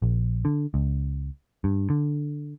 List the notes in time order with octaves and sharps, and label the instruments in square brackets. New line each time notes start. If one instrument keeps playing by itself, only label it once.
[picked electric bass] A#1
D3
C#2
G2
D3